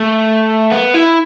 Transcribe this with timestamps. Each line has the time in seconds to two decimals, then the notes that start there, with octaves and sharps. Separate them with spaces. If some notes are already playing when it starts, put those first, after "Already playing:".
Already playing: A3
0.72 B3
0.94 E4